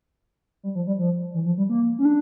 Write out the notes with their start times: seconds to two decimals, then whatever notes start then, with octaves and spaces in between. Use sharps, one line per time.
0.63 G3
0.75 F3
0.87 G3
0.99 F3
1.34 E3
1.46 F3
1.58 G3
1.69 A#3
1.99 C#4
2.05 D4